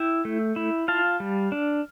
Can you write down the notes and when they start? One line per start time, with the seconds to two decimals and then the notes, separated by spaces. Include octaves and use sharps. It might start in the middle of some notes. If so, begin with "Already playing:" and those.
Already playing: E4 E5 G5
0.25 A3
0.56 E4
0.88 F4 F5 A5
1.20 G3
1.52 D4